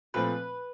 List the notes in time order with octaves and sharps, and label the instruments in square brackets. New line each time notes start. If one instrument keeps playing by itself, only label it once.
[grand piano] A#2 F3 A3 C4 [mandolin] B4